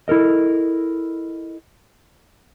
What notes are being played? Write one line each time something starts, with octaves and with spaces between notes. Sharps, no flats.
E4 A4 A#4 D#5